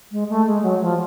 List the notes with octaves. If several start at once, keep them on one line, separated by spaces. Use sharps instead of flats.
G#3
A3
G#3
F#3
F3